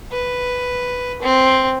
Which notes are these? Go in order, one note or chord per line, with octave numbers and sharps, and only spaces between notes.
B4
C4